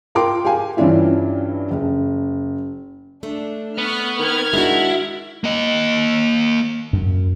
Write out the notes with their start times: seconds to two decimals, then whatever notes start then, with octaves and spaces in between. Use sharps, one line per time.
0.15 F4 A#4 G5 C6 D6
0.45 G4 G#4 F5 G#5
0.77 G2 E3 C#4 D4 E4 F4
1.71 F#1
3.23 A3 D4
3.78 B3 C#6 F6 F#6
4.19 D#3 F6 G#6
4.54 G#3 D4 E4 F#4
5.44 A#3 D#5
6.93 F#2